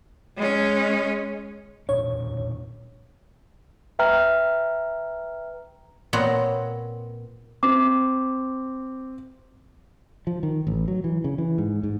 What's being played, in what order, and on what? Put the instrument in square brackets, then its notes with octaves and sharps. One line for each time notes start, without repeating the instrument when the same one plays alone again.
[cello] G#3 C#4
[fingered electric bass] E1 A#2 D4 [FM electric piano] C#5
[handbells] B4 E5 G5 A#5 F6
[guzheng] A#2 B3 C4 C#5 F#5 A#5
[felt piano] C4 [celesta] D6
[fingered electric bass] F3
D#3
A1
F#3
E3
C#3
E3
G#2
G#2